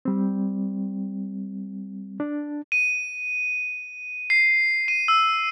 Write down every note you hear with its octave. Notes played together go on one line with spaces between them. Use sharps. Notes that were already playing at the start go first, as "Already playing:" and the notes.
G3 C4
D4
D#7
C7
D#7
E6